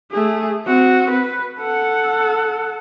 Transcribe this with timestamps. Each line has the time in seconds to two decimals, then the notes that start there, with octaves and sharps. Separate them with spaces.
0.12 A3 G#4
0.66 C4 F#4
1.10 B4
1.59 A4 F#5